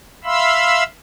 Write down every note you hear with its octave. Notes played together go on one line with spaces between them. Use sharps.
E5 F5 B5 C6 E6